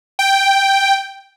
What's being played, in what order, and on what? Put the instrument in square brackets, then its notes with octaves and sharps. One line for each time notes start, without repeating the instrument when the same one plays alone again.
[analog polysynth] G5